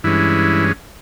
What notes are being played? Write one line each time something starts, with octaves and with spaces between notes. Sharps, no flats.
G2 E3 G#3 C#4 E4